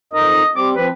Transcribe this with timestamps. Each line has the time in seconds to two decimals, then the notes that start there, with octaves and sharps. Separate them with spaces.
0.13 F2 D#4 A#4 D#5
0.56 G3 C4 D6
0.76 F3 C4 B4